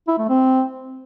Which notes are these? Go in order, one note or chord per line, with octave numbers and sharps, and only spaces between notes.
E4
A3
C4